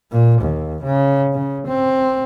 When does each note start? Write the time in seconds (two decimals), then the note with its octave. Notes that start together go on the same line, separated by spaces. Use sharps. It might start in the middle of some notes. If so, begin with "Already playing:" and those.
0.12 A#2
0.42 D#2
0.84 C#3
1.33 C#3
1.67 C4